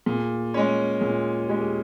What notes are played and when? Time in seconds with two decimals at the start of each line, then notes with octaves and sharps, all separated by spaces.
0.06 A#2 G#4
0.54 G#3 C#4
1.01 A#2 G#4
1.48 G#3 C#4 G4
1.61 G#4